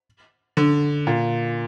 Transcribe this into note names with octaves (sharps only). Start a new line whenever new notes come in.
D3
A#2